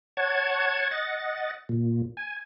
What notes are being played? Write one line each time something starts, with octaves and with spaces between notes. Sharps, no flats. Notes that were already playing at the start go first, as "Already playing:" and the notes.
C#5 F#5 A5 G#6
D#5 F#5 A6
A#2
G#5